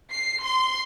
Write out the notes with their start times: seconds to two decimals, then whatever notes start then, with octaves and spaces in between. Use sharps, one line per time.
0.12 C7
0.41 C6